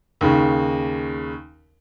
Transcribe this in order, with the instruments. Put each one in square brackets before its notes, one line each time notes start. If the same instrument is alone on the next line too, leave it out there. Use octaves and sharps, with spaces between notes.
[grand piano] D#2 C#3